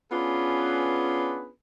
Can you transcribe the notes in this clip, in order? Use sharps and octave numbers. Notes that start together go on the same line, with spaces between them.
B3 C#4 D4 F4 G#4 B4